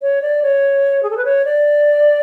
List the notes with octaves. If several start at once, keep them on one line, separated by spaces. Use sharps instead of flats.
C#5
D5
C#5
G#4
A4
B4
C#5
D5